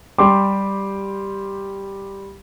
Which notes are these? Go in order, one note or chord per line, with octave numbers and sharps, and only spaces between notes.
G3 G4 C6 D6